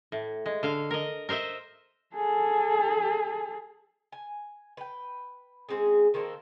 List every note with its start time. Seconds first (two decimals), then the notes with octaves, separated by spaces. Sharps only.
0.12 A2
0.46 G#3
0.63 D3 F5
0.91 A#4 D#5
1.29 A#4 C5 D#5 E5
2.15 G#4 A4
4.12 G#5
4.77 B4 G5
5.69 G#3 C4 C#4 G#4
6.14 D#3 A#3 C4 A4